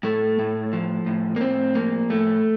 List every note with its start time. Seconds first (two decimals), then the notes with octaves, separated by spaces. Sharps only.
0.03 A2 A3
0.39 A2
0.73 F3
1.06 A2
1.36 A#3
1.41 A2 C4
1.75 F3 A#3
2.10 A2 A3